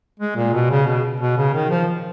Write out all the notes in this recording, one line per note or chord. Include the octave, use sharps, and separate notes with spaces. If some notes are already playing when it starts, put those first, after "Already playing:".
G#3
A#2
B2
C#3
B2
B2
C#3
D#3
F3